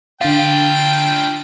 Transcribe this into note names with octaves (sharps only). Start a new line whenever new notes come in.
D3 D4 F4 F5 G5 A6